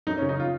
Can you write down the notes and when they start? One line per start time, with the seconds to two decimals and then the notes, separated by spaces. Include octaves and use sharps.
0.07 F#2 D#4
0.18 C#4
0.22 C#3
0.29 D#4
0.40 F4